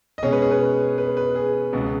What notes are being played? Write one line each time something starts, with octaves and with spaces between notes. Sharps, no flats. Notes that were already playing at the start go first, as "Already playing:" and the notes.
D#5
B2 G#3 C#4 G#4 C#5
B4
G#4
B4
B4
B4
G#4
C#2 B2 B3